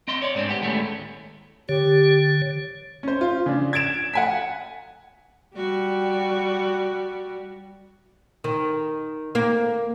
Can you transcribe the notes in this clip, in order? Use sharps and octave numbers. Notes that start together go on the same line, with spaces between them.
C4 D#5 C6
C#5 D5
G#2 G#3 B3 C4 D4
B3 G4
D#2 A2 G#3 A3 C#4
D3 G4 C#5
C#4 C5
F4
C#3 D4
G#6 A6 D7 E7
F#5 G#5 B6
G3 F#4
D#3
A#3